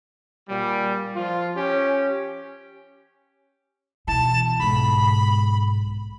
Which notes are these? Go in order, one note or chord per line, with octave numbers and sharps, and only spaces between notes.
A#2 G3
F3 F4
C#4 G4
B2 E3 A5
B1 G#2 B5